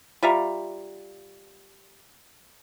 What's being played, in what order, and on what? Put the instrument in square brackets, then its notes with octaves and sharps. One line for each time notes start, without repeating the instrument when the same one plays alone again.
[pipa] G3 F4 E5 A#5